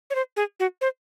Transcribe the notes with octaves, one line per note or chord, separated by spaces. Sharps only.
C#5
C5
G#4
F#4
C5